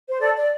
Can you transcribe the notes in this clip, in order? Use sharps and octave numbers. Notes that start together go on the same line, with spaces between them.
C5
A4 D5
D5